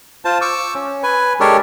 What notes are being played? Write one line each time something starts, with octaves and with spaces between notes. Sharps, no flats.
F4 C5 A5
C#6 D6 E6
C#4
B4 G#5
G#3 D4 G4 A4 A#4 C#5